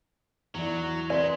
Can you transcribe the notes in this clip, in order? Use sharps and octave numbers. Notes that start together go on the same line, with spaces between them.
E2 E3 F#3 D5
C3 B4 D5 G#5 C6 B6